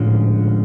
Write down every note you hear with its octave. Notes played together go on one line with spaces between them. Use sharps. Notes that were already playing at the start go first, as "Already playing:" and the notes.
Already playing: A2 D3 F3 G#3 C#4